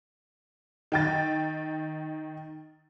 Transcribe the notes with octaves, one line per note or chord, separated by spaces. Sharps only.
D#3 G5 A6